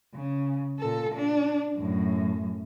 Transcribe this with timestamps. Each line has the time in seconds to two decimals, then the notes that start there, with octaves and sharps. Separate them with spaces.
0.14 C#3
0.79 A#2 A4
1.15 D4
1.77 F#2 A2